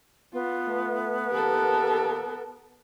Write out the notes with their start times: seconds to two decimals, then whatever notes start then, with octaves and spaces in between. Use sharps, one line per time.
0.33 B3 F4
0.66 A3
1.31 A#2 D#3 G4 A4 A#4